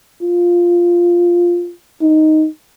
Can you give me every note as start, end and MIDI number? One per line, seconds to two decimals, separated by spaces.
0.22 1.72 65
2.02 2.47 63